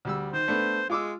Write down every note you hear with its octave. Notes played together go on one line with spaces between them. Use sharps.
D2 G3 E6
D#3 C5
A3 B3 D4
G#3 F4 D6 E6